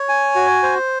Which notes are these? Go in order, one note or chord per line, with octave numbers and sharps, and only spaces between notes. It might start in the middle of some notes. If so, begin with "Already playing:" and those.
Already playing: C#5
G#5
F#4
C5